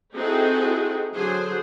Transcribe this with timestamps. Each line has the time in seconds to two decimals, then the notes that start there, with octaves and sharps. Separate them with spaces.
0.15 C4 D#4 E4 F#4 G#4 A4
1.15 D3 F#3 G#4 A4 C5